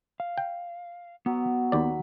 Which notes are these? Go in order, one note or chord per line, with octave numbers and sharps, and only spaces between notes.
F5
G5
F#3 B3
D#2 D5 B5